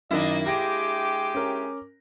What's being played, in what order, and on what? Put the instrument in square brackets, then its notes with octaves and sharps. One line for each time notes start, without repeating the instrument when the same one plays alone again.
[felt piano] F#2 D#3 [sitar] A#3 D4 E4 [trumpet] D#5
[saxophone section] G#3 G4 [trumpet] D6 [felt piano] A#6 D7
[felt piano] C#4 A#4